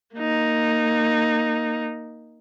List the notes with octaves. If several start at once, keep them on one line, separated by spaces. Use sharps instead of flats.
A#3 D#4